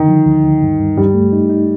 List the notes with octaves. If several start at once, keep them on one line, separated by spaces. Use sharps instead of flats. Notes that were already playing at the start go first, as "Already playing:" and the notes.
Already playing: D3 D#3
F3
D2
D2
G2
G2
G2 G3
A3
D#4
D#4